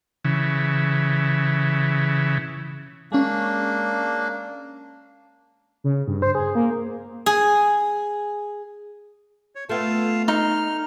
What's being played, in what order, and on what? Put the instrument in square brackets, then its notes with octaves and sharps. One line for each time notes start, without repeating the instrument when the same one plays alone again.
[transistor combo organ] C#3 E3
[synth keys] G#3 C#4 [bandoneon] A#3 D4
[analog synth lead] C#3
G2
C5
G#4
A#3
[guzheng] G#4
[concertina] C#5
[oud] A3 B3 [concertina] F4 F5 A5
[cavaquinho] D#4 [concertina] F6